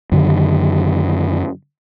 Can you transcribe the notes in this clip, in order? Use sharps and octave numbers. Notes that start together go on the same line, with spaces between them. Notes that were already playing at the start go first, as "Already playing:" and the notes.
F#2 D3 D#3